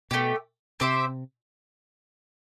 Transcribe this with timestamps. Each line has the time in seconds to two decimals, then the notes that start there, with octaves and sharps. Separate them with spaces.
0.11 B2 A3 E4 G4
0.80 C3 C4 G4 C5 E5